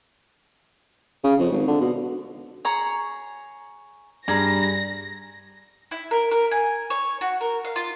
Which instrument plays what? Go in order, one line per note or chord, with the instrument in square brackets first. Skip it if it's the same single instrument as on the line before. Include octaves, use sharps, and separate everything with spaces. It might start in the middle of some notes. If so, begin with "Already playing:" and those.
[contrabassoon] C#3
F2
G#1
D3
B2
[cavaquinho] G#4 C#5 A#5
[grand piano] G2 [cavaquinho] G#4 A#5 [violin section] A#6
[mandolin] E4
A#4
A#4
G#5
C#5
F#4
A#4
F5
F4